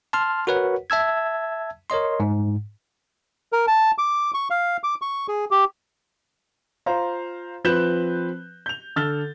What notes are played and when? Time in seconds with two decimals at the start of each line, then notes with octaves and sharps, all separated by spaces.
0.13 A5 C6 F6
0.47 F#4 A#4 B4 C#5 F#5
0.90 E5 A5 E6 G#6
1.90 A#4 C#5 D#5 C6
2.20 G#2
3.53 A#4
3.67 A5
3.98 D6
4.34 C#6
4.50 F5
4.84 D6
5.02 C#6
5.28 G#4
5.51 G4
6.86 F4 C5 F5 A#5
7.64 F3 C4 B4 F#6 G6 E7
8.66 G6 F7
8.96 D3 A4 E6 F6 A6 G7